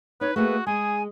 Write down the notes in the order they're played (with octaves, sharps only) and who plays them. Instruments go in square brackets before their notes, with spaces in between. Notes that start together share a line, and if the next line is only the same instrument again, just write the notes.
[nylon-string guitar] D#4 [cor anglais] B4 [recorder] C#5
[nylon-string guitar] A3 A#3 G#4 [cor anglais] F#4 [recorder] B4
[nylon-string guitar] G#3 [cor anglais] G#4 [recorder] G#5